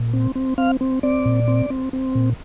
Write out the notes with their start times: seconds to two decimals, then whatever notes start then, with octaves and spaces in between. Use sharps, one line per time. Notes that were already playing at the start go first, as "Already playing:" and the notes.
Already playing: A#2
0.13 C4
0.35 C4
0.58 C4 F5
0.81 C4
1.03 C4 D5
1.26 A#2
1.48 C4
1.70 C4
1.93 C4
2.15 A#2